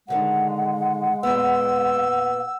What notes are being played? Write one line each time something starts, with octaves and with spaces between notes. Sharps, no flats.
A2 D3 D#3 G#3 F#5
A#2 B3 E6